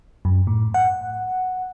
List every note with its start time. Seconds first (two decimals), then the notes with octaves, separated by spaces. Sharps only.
0.25 F#2
0.47 A2
0.74 F#5